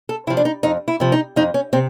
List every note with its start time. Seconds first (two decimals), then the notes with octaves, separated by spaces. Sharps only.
0.09 A4
0.27 C3 E4
0.30 F3
0.37 D4
0.45 D#4
0.63 F2 D#4
0.88 E4
1.00 C3 F3
1.12 D#4
1.36 F2 D#4
1.54 C#4
1.73 C3 C4